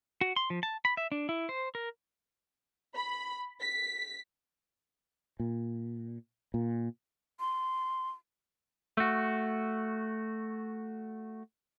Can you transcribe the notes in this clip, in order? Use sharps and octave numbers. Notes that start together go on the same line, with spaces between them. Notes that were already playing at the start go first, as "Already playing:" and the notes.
F#4
C6
F3
A5
B5
E5
D4
E4
C5
A#4
B5
B6
A#2
A#2
C6
A3 F#4